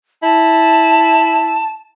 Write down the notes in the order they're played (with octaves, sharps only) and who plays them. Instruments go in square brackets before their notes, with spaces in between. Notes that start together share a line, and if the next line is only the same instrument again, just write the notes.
[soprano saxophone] E4 [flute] A5